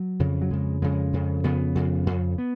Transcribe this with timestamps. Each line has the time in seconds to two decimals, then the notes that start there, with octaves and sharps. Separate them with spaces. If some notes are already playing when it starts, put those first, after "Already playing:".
Already playing: F#3
0.19 F2 C#3
0.42 F#3
0.51 F2 C#3 G#3
0.82 F2 C#3 G#3
1.13 F2 C#3
1.44 F2 C#3 B3
1.75 F2 C#3
2.07 F2 C#3
2.38 B3